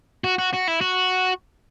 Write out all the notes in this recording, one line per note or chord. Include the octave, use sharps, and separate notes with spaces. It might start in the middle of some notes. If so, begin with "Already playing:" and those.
F#4
F#4
F#4
E4
F#4